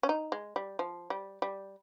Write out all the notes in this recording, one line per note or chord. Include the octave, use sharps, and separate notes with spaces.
C#4
D#4
G#3
G3
F3
G3
G3